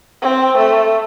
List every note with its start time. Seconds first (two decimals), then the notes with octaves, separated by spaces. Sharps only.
0.22 C4
0.57 A3